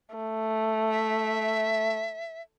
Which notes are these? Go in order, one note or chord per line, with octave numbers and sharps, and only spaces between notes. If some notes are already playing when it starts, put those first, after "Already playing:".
A3
E5